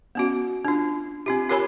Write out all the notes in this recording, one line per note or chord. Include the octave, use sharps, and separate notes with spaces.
B3 C#4 F#4
D4 F4
C4 F4 G4
F4 G4 A#4 C#5 G#5 B5